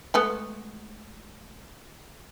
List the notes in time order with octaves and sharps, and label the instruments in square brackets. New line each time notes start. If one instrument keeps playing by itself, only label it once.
[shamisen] G#3 A3 B3